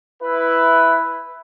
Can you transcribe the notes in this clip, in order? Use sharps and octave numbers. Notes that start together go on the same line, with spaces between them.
E4 B4